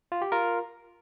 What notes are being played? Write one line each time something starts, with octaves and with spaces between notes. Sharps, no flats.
F4
G4
F4 A#4